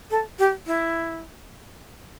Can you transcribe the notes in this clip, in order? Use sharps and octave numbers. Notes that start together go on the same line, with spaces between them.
A4
G4
E4